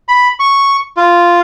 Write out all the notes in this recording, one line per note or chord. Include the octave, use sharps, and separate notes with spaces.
B5
C#6
F4